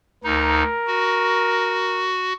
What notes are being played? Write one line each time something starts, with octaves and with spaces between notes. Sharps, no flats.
D2 D#4 A#4
F#4